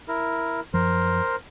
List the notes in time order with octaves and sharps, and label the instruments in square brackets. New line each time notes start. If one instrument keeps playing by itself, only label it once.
[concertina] E4 A#4
[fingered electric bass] F#2 F3 [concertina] A#4 C5